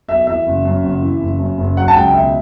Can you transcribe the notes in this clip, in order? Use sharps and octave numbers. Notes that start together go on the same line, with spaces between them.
B1 E5
E3 E5
F#1
F#2
F#1
E3
F#1
F#2
F#1
F#3 F#5
A5
C#2 G5
B2 E5